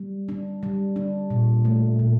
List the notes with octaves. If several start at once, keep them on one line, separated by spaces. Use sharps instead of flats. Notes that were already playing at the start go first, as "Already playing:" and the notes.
Already playing: G3
D4
G3
D4
A#2
A3
A#2